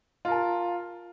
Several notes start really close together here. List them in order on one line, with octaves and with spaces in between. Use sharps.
F4 A#4 A5